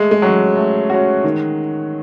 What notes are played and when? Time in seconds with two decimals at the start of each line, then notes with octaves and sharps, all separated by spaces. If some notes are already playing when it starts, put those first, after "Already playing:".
Already playing: G#3 A3
0.11 G#3
0.22 F#3 C#4 F#4
0.56 A3
0.90 C#4 F#4
1.24 D#3